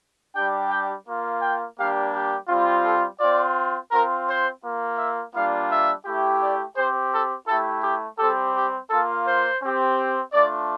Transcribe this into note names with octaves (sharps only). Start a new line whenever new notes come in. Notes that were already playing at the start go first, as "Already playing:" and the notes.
G3 D4 G4 G5
G5
A#3 F4
G5
G3 A#3 D4 G4 F5
G4
G3 C4 F4
A4
C4 F4 D5
C4 F4 A#4
C5
A#3 F4
E5
G3 A#3 D4 F4 F5
E5
A3 E4 G4
D5
C4 G4 C5
A4
A3 E4 G4 A4
G4
G3 C4 G4 A4
G4
A#3 F4 A4
C5
C4 G4
A3 D4 F4 D5